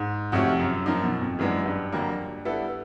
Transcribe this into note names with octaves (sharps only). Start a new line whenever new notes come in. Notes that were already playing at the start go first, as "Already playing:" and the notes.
Already playing: G#2
F2 C3 F3 A3 C#4 F#4
F#2
F#2 F3 A#3 D#4
B2
F2
F#2 E3 G#3 B3 D4
G2
F2 D3 F#3 A#3
G3 B3 E4 A4